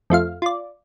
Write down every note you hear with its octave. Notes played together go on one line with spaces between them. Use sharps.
F2 A3 F4 F5
F4 D5